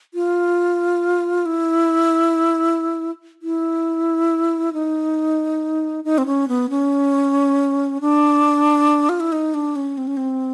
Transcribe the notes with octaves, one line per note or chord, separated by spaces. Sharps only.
F4
E4
E4
D#4
D#4
C4
C#4
B3
C#4
D4
F4
E4
D#4
D4
C#4
C4
C#4
C4